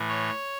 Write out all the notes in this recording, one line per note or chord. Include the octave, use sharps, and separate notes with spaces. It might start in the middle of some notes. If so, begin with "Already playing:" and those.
Already playing: A2 E3
C#5